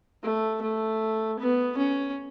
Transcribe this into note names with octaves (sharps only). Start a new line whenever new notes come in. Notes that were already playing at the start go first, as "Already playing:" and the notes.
A3
A3
B3
C#4